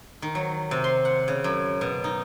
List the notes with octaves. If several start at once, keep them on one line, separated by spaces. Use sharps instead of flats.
D#3
F#3
C3
C6
F#5
C#3
F#2
B2
D#4